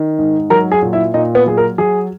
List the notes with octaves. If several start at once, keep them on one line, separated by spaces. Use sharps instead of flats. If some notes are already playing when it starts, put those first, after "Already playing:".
Already playing: D#3
G#2
F#3 A#4 A#5
G#4 G#5
A#2
E4 E5
A#2 D#4 D#5
B3 B4
F#3 G#4
A#4
F#3 G#4